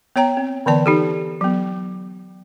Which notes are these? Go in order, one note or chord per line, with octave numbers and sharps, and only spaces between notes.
B3 C#5 G5 A#5
C4
D3 E3 B3 D5 A5
D#4 G4 A4
F#3 B3